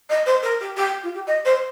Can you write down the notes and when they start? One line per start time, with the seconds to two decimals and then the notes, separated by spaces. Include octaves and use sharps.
0.09 D#5
0.26 C5
0.42 A#4
0.60 G4
0.76 G4
1.03 F4
1.14 G4
1.27 D#5
1.45 C5